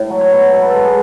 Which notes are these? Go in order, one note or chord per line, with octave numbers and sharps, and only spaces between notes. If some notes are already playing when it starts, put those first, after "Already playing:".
Already playing: A2
F#3
C#5
B3
B2 A4
B4
A4
G#3
G#4